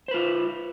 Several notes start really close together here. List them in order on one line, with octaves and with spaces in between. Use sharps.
C5 B4 F4